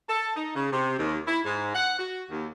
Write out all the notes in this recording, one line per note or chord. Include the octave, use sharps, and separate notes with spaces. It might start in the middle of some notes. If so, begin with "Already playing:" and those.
A4
D#4
C#3
C3
D#2
E4
G#2
F#5
F#4
D#2